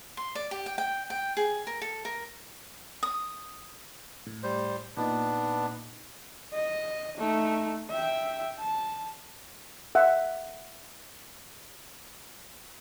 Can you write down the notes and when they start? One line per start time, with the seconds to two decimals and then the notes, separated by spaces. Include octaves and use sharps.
0.17 C6
0.35 D5
0.51 G4
0.66 G5
0.78 G5
1.10 G5
1.37 G#4
1.67 A#4
1.82 A4
2.05 A#4
3.03 D#6
4.27 A2
4.43 G3 C5
4.97 A#2 B3 D4 D#4
6.53 D#5
7.18 A3 D#4
7.90 E5 G5
8.59 A5
9.95 E5 F#5